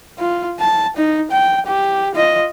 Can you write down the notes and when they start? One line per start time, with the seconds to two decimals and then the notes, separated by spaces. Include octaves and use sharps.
0.19 F4
0.60 A5
0.97 D#4
1.31 G5
1.66 G4
2.15 F4 D#5